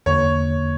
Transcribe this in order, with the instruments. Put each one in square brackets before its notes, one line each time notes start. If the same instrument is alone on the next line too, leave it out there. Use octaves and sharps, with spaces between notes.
[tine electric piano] E2 D3 A#3 [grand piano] C#5